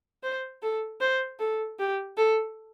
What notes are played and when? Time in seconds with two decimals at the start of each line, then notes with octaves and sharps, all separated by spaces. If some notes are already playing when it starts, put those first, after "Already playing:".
0.23 C5
0.63 A4
1.01 C5
1.40 A4
1.79 G4
2.17 A4